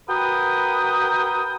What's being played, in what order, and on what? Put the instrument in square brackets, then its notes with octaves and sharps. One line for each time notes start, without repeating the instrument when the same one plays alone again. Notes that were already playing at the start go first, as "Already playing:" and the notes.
[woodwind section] F#4 A#4 B4 G5 D#6